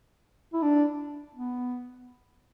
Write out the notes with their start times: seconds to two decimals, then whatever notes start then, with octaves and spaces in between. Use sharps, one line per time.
0.53 E4
0.62 D4
1.35 B3